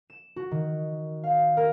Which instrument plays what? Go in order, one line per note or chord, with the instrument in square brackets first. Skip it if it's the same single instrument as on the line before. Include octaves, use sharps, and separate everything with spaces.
[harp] E7
F#4
D#3
F5
A#4